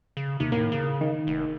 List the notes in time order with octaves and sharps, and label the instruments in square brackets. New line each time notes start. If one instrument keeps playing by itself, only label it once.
[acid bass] C#3
[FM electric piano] D#2 [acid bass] C3
[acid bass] A2 [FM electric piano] A#3
[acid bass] C#3
[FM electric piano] D#3
[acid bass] F1